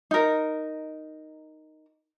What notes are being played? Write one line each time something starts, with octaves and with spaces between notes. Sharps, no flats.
D#4 A#4